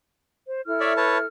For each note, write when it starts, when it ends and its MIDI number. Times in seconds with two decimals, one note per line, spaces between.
0.46 0.61 72
0.66 1.25 64
0.66 1.25 69
0.66 1.25 89
0.80 0.93 73
0.80 0.93 74
0.80 0.93 76
0.97 1.18 71
0.97 1.18 73
0.97 1.18 81